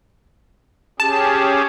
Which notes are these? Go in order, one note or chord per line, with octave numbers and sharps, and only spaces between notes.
C#4 G4 G#4 A5